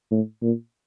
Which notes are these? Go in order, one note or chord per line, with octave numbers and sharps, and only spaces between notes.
A2
A#2